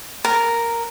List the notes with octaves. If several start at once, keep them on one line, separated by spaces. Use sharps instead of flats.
A#4